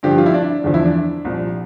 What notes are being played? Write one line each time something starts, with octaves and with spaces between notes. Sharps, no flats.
G2 D3 F3 G4
F4
E4
D4
E2 D3 F3
E4
D4
C2 A#2 F3